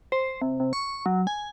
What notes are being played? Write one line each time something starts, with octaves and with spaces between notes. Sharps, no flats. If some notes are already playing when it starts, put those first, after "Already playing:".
C5
C3
C3
C#6
F#3
G#5